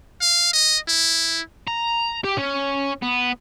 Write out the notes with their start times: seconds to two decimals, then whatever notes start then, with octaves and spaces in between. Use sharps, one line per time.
0.21 F5
0.53 D#5
0.88 E4
1.68 A#5
2.24 G4
2.37 C#4
3.02 B3